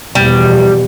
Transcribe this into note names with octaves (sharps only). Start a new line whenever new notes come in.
E2 B2 F3 G3